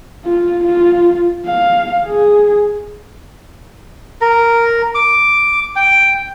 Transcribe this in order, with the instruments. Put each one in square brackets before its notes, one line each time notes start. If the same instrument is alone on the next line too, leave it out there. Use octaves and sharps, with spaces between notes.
[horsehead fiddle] F4
F4
F5
G#4
[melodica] A#4
D6
G5